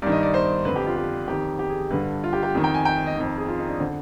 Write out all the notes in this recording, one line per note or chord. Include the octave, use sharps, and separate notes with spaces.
G2 D#3 D5
D#5
D5
C5
F2 D3 B4
G4
F4
G4
F2 D#3 G4
G4
G#4
G2 D3 B4
F4
G4
G4
F2 D#3
G5
G#5
G5
D#5
F2 D#3
G#4
F4
D#4
D4
D3 C4